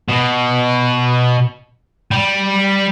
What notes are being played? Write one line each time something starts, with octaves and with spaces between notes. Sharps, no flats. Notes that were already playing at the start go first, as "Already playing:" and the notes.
B2
G3